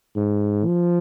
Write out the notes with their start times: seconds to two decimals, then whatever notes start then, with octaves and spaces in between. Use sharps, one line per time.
0.16 G#2
0.66 F3